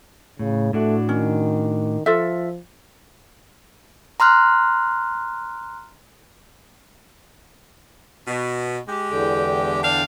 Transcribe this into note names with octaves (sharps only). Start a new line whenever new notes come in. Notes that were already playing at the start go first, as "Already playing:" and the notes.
A2 C#3
A2 A3 D4 F#4
D#3 C#4
F3 F4 A4 E5
A#5 C6 F6 F#6
B2
G#3 G4
E2 D3 G5
D4 D5 F5